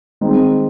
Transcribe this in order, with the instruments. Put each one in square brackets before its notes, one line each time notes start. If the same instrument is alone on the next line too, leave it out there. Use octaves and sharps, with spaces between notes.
[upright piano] D#3 G#3 C4 D#4